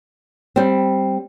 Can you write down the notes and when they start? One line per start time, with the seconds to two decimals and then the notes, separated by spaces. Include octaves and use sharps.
0.56 G3 C4